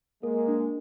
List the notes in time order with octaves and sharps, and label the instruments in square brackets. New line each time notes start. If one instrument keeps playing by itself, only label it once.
[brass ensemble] G#3 A#3 [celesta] A#4
[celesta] D4